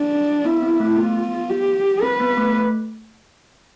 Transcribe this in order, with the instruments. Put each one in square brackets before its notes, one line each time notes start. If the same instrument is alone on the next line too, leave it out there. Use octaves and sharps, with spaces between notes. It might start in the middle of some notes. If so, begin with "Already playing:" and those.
Already playing: [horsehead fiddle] D4
[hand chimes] B3 [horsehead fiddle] E4
[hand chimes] C4
A3
[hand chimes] B3 [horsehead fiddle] F4
[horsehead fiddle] G4
[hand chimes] C4 [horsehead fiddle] B4
[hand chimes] B3
A3